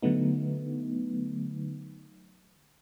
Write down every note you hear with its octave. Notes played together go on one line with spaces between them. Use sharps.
D3 F#3 A3 B3 D#4